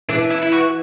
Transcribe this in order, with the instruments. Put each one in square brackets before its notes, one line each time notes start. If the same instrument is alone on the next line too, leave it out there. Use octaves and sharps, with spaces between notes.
[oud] E3 [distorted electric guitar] D4
[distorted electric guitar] E4
E4
F#4